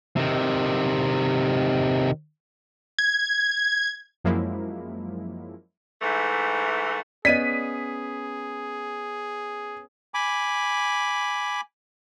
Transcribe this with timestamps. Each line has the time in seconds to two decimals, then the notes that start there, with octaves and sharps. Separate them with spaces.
0.16 C3 D#3
2.99 G#6
4.24 F#2 F3 F#3 G#3 A#3 E4
6.01 G#2 E3 A3
7.25 B3 C#4 G#4 D5 D#5 B6 D#7
10.14 G#5 B5 D6